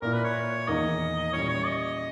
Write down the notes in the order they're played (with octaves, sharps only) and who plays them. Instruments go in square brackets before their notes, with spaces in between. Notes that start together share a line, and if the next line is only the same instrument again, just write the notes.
[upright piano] A#2 A#3 E4 [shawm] A#4
[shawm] B4
C#5
[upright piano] E2 D#3 A#3 D#4 [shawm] D#5
[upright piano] A#2 G3 C#4 E4 [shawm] C#5
[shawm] C#5
D#5